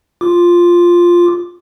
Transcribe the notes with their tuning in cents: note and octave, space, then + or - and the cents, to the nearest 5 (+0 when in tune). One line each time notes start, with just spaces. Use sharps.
F4 +0 D6 +0